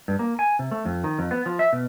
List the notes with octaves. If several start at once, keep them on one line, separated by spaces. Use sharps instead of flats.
G2
A#3
G#5
C3
A3
F2
D#3
F2
B3
F3
E5
B2